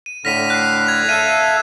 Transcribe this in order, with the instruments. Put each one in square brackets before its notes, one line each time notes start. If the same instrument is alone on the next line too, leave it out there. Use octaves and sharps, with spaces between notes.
[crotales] D#7
[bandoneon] A2 D3 F6 [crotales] A#6 B6 D#7
[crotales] F#6 C7
G#6 F7
[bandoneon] A4 E5 F5 [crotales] D#7